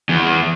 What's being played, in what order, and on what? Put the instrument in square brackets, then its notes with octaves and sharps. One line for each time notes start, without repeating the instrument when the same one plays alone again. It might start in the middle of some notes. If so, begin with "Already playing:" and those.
[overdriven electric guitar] E2